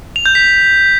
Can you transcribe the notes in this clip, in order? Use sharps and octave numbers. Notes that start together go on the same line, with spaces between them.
F7
G6
B6